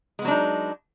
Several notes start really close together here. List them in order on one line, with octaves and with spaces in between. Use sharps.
G#3 B3 F#3 D4 D#4